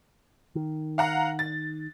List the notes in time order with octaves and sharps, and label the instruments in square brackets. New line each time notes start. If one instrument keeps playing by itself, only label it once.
[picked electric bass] D#3
[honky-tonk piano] F5 F#5 A#5
A6